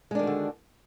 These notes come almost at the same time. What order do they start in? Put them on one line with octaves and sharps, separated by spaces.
G#3 D4 D#3 F#4 D3